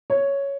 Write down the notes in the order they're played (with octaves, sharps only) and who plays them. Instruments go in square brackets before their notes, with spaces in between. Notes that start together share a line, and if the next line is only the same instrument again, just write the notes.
[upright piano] C#5